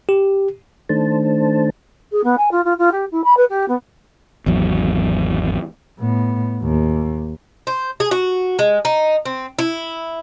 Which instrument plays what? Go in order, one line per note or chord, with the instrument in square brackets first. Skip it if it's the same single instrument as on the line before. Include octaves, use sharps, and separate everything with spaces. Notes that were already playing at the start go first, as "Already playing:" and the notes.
[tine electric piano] G4
[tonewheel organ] D#3 A3 D4 C5 A5
[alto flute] G#4
B3
G#5
F4
F4
F4
G4
E4
B5
B4
G4
B3
[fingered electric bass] G#1 E2 F#3
[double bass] A2 B3
D#2
[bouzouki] C5
G#4
F#4
G#3
D#4
C4
E4